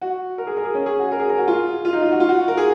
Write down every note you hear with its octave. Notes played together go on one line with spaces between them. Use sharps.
F#4
A#4
G#4
A#4
G#4
C#4
G#4
F#4
A#4
G#4
A#4
F#4
F4
F4
D#4
F4
F#4
F4
F#4
A#4
G#4